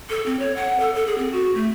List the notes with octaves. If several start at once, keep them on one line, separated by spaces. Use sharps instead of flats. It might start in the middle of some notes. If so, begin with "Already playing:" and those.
A4
C4
C#5
F#5
A4
A4
G#4
C4
F#4
A3